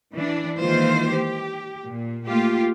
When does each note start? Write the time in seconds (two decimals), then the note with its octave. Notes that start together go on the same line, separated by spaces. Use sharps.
0.14 E3 D4
0.59 D#3 E3 G#3 A#3 F4 C5
1.13 G4
1.86 A#2
2.28 A3 A#3 F4 G4